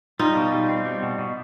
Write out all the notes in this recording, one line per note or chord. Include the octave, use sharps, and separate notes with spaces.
G3 D#4 F4
B2
G3
C4
G3
B2
B2